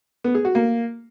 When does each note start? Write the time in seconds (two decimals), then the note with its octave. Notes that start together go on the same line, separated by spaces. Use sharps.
0.24 B3
0.35 G#4
0.45 F#4
0.55 A#3